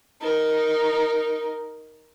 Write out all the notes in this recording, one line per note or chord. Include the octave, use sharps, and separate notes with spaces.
D#4 A#4